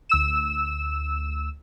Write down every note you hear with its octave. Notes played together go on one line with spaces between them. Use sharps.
D2 E6 E7